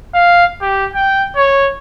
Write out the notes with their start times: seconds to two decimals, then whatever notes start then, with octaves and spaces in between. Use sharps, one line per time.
0.14 F5
0.61 G4
0.94 G5
1.36 C#5